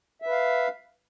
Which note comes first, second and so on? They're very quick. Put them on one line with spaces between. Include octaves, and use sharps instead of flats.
E5 B4 F5